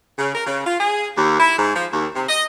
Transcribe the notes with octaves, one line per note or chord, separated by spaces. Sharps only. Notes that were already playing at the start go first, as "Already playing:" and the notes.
C#3
A#4
C#3
F4
G#4
D#2
E4
G#2
F3
D#2
C3
D#5